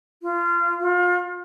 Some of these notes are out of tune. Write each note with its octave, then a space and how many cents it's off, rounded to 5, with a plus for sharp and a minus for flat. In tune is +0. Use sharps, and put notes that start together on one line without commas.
F4 -25
F4 +30